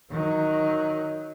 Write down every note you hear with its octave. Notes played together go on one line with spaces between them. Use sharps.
D#3 F#3